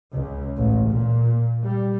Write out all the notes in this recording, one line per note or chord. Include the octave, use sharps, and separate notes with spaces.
C#2
A1
A#2
G3